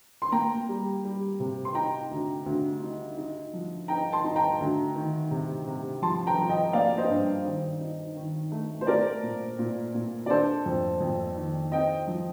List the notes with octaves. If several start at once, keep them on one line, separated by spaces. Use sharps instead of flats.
C6
A#3 G5 A#5
G3
G3
C3
C6
D#4 G5 A#5
D2
D2
D#4
D#4
F3
D#4 G5 A#5
A5 C6
D#4
G5 A#5
D2
D#3
C3
C3
F3 A5 C6
G5 A#5
F3
D#5 G5
A#3 D5 F5
C5 D#5
G2
D#3
D#4
D#3
A3
C5
A3 A#4 D5
A#2
A#2
A#2
D5
D4 A4 C5
F2
F2
D#3
C4 D#5 G5
F3